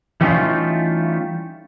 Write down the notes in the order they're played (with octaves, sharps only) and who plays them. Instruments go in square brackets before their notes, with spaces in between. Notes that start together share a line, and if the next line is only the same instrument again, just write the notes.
[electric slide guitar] E3 G3 A3 C#4 D#4 F4